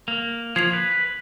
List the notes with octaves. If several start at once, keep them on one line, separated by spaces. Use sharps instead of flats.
A#3
F3 G#6 C7 F7
B4